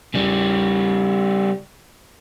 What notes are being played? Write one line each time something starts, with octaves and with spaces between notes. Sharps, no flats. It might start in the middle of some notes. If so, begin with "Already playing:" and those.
C#3 G3